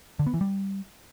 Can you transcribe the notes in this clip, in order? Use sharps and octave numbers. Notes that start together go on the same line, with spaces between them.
D3
B3
E3
G3